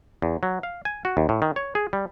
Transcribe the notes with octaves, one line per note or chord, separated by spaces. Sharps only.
E2
F#3
F5
G#5
F#4
D#2
A2
D#3
C#5
G#4
G3